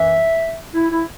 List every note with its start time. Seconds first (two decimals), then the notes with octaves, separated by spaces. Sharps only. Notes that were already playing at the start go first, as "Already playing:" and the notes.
Already playing: F#2 E3 E5
0.75 E4
0.91 E4